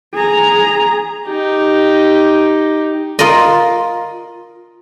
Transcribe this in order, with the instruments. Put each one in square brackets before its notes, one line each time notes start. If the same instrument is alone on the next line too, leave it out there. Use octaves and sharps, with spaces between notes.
[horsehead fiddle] G#4 A#5
[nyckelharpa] D#4 G4
[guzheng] F4 A#4 D5 D#5